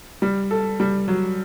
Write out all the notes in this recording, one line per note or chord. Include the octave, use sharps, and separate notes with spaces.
G3
A4
G3
F#3